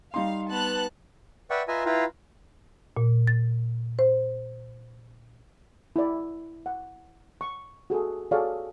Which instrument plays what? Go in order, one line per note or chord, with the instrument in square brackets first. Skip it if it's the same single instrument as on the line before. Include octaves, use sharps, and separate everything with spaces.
[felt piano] G3 D#4 C6 [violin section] F5
[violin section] B3 A5 F#6
[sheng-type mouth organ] B4 D5 E5 F#5 G5 C#6
F4 B4 D#5 E5 G#5 A#5
E4 F4 B4 F5 G5 A#5
[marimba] A#2
A6
C5
[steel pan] E4 D5
F#5
C#6
F#4 G#4 A4
F#4 G#4 A4 C#5 D5 F5